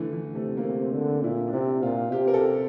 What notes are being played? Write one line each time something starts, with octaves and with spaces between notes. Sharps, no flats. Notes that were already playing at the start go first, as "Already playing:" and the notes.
Already playing: D3 E3 A3
E3
C3 A3
A#3
C3
C4
D3
D4
D4
A#2 E4
D4
C3 E4
A#2 F4
C3 G4
A#4
A4